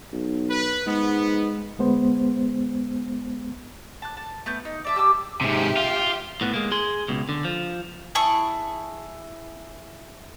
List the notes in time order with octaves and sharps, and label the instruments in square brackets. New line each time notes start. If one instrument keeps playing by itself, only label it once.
[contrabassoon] B1
[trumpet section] B4
[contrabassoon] G#2 [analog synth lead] G#3 [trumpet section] B3
[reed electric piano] D2 G#3 B3 C5
[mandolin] A5 F#6
A5
A3 B3 G6
D#4
D5 E5 A5
G4 A5 D#6 E6
[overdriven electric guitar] G#2 C3 [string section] G4 E5
[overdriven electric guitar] F4
[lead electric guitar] A2 B3
G#3 A#3
G#4 C6
C#2 B2
D3
F3
[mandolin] E4 G#4 A5 C#6